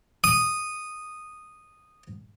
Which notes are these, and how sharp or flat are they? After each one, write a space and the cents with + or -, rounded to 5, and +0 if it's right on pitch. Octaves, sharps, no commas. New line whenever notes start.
D#6 -10